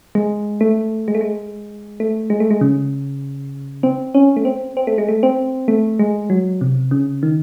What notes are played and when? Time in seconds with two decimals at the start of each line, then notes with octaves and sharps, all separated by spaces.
0.15 G#3
0.61 A3
1.08 G#3
1.15 A3
1.21 G#3
2.00 A3
2.30 G#3
2.40 A3
2.51 G#3
2.61 C#3
3.83 C4
4.14 C#4
4.37 A3
4.45 C4
4.77 C4
4.87 A3
4.98 G#3
5.08 A3
5.23 C4
5.68 A3
5.99 G#3
6.30 F#3
6.61 C3
6.91 C#3
7.23 D#3